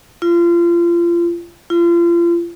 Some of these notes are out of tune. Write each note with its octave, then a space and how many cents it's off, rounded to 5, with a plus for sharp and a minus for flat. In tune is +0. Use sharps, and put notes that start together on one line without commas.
F4 -30
F4 -35